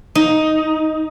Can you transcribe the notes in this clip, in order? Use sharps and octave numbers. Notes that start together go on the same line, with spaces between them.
D#4